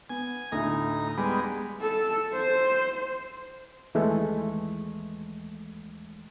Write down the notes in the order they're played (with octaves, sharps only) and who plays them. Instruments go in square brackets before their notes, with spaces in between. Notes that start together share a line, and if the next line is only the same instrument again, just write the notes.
[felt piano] B3 [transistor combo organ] G#5
[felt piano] D2 A2 [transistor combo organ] D#4 A#5
[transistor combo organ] G3 G#3 B3
[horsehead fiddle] A4
C5
[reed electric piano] D#2 E3 G#3 A3